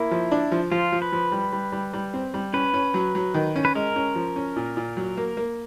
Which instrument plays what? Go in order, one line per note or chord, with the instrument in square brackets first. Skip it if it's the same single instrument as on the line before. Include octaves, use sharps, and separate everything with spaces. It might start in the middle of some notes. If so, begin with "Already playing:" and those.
Already playing: [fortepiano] A#3 [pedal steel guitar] E4
[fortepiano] F3
D4
F3
[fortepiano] F3 [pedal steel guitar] F4
[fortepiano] F3
[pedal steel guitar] B4
[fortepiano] F3
G3
G3
G3
G3
C4
G3
[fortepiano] C#4 [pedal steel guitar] B4
[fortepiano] C#4
F#3
F#3
D#3
C#4
[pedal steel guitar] B4
[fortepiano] G#3 [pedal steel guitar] A#4
[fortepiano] C#4
F3
C#4
A#2
A#2
F#3
A#3
A#3